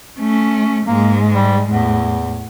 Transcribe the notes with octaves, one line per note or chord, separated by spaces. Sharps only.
A3 C#4
G#2 G#3 A#3
G3
E2 A2